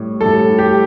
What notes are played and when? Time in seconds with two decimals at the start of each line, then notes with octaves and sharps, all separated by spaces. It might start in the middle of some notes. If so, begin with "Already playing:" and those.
Already playing: A2 G3
0.21 A2 G3 A4
0.58 G4